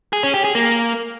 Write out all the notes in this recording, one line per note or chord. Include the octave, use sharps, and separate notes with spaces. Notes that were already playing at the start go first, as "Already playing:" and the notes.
G#4
C#4
G4
G#4
A#3